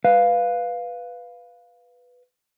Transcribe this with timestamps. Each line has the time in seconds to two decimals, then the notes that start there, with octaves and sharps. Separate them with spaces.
0.04 B4 F5